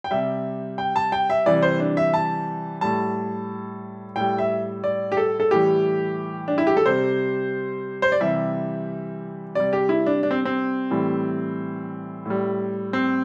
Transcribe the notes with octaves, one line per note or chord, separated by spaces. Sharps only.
G5
C3 G3 E5
G5
A5
G5
E5
C3 E3 G3 D5
C5
D4
E5
A5
A2 G3 A5
A2 G3 G5
E5
D5
G4
A4
A4
A2 E3 G3 G4
D4
E4
G4
A4
C3 G3 C5
C5
D5
C3 E3 G3 E5
C3 G3 D5
G4
E4
D4
D4
C4
C4
A2 E3 G3
A2 G3
C4